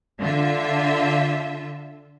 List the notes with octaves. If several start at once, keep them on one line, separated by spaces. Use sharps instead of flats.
D3 F4 E5